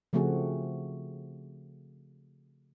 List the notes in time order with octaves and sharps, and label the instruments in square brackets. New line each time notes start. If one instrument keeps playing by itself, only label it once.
[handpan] C#3 F3 A3 C4 F#4 G#4